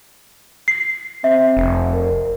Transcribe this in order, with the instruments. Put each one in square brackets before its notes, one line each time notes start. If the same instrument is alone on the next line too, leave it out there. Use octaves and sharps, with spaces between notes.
[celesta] C7
[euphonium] C4 [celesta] E5
[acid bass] F1
[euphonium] A#4